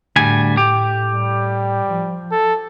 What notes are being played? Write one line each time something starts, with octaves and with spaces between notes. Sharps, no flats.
D2 A2 G3 G#5
G4
G3
F3
A4